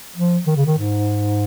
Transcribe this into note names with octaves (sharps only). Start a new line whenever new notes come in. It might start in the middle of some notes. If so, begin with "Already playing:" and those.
F3
D#3
C#3
D#3
G#2